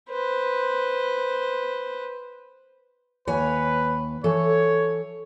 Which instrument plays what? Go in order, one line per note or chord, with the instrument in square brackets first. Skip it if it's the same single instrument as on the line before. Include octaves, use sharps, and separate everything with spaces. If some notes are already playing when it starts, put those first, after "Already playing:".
[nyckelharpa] B4 C5
[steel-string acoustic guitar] D#2 C#5 G#5 [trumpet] B4
[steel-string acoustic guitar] E3 A4 [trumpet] C#5